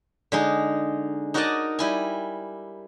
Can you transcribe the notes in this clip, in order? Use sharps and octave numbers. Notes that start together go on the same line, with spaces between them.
D3 G#3 D#4
D#4 F#4 A#4 D5 D#5 A5
G3 E4 G#5